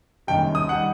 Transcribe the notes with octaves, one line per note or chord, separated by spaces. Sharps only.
F#1 F#2 D#3 G3 G5
D#6
D#3 G3 F#5